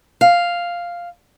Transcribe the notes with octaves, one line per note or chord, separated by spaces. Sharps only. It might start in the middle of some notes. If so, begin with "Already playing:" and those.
F5